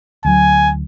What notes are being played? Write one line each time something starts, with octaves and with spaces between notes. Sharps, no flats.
D2 F#3 G#5